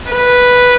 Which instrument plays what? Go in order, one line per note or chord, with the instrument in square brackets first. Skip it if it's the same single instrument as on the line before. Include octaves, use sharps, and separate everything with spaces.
[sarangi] B4